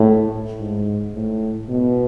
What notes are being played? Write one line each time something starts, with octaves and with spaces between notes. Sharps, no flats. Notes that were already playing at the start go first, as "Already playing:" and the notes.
Already playing: A2
G#2
A2
B2